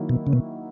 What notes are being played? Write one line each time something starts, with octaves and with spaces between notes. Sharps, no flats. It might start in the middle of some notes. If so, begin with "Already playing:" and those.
Already playing: D#3 F#3 A#3 E4
B2
C#3
B2